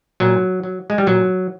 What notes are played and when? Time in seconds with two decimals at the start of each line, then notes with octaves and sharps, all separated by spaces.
0.20 A#2 F#3
0.64 F#3
0.90 G#3
0.98 G3
1.07 A#2 F#3